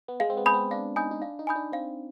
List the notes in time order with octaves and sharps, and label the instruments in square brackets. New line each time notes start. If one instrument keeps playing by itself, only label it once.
[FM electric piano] B3
[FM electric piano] G#3 [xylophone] F5
[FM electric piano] C4
B3
[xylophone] G#5 B5 D#6 G6
[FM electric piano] C4
[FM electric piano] D4 [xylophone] F5
[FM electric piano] D#4 [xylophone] G#5 B5 D#6 G6
[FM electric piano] D#4
[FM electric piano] D4 [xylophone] F5
[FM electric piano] D#4
[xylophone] G#5 B5 D#6 G6
[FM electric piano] D4
[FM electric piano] C4 [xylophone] F5